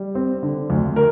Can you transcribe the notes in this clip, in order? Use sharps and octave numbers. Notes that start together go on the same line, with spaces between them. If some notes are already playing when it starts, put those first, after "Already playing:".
Already playing: G3
C4
D3
D2
A#4